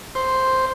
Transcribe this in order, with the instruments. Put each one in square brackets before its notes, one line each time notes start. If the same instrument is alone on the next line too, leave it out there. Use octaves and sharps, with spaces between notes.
[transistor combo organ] C5